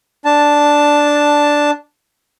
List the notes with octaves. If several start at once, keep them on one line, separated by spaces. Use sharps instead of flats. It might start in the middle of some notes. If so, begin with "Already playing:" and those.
D4 A5